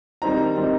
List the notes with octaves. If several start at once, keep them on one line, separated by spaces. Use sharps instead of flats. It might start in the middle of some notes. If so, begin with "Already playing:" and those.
D#3 G3 C4 D#4 A#5
D#3 G3 C4 D#4